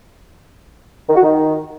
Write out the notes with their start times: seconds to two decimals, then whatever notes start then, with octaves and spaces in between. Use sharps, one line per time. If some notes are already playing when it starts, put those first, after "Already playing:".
1.09 D#3
1.16 F#4
1.23 D#3